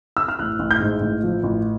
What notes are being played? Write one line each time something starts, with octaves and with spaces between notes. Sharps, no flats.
E6
F6
A1 F#6
A1
G6
G#2
A1
F3
A1